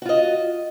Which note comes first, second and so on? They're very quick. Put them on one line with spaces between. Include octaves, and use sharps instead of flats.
F#4 F4 D#5